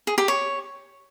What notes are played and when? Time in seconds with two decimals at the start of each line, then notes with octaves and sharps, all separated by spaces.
0.07 G#4
0.18 G4
0.28 C#5